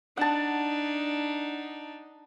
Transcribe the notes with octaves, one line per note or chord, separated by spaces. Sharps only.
D4 D#4 F#5 A5